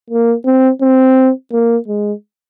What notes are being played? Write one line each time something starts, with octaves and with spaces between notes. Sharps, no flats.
A#3
C4
C4
A#3
G#3